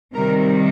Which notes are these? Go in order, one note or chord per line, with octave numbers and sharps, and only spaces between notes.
C3 D#3 G3 A#4